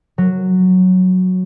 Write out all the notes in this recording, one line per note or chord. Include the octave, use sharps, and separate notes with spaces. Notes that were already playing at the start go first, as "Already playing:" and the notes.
F#3